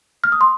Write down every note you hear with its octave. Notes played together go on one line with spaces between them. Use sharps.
F6
D#6
C6